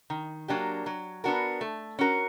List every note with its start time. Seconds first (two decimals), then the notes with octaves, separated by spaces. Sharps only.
0.10 D#3
0.48 F#3 A#3 D4 G4
0.86 F#3
1.24 B3 D4 F#4 A#4
1.61 A3
1.99 C#4 F#4 A#4